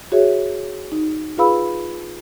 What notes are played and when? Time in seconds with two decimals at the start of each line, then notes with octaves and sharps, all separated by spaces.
0.12 F#4 G#4 C#5 E5
0.92 D#4
1.38 F4 G#4 B4 F5 B5 E6